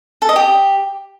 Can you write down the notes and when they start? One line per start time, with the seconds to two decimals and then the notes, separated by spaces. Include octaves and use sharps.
0.22 A4
0.29 D#5
0.36 G4